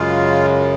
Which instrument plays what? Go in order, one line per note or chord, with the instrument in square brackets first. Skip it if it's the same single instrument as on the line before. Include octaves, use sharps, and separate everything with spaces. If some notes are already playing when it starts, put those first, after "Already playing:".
Already playing: [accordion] F#2 C#3 G#3 F4